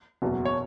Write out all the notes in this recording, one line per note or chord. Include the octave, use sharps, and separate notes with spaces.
F#1 E2 B2 F#3
C#5